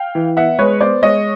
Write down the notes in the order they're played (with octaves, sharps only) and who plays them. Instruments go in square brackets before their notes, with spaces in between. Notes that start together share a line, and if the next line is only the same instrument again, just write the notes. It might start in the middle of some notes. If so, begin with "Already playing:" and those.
Already playing: [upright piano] F5 G5
E3
B3 E5 F#5
G#3 B4 C#5
B3 C5 D5
G#3 C#5 D#5